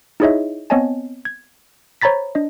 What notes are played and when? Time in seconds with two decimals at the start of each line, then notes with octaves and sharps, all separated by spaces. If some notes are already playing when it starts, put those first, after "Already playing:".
0.20 D#4 E4 G#4 C#5 D#5 E5
0.70 B3 C4 C#5 D#5 G#5 A5
1.25 G#6
2.01 C5 C#5 A#5 B5 A6 B6
2.35 D4 D#5